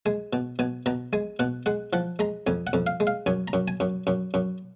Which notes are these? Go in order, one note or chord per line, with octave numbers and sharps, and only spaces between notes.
G#3 G#5
B2
B2 G#5
B2 A#5
G#3 G#5
B2 F#5
G#3 F#5
F3 F#5
G#3 A#5
F2 G#5
F#5
F2
F5
G#3
F5
F#2 G#5
A#5
F#2
G#5
F#2
F#2
F#2